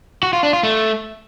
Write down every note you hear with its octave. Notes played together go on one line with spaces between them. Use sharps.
F#4
F4
D4
F4
A3